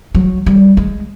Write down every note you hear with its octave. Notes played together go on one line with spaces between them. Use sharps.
F#3
G3
G#3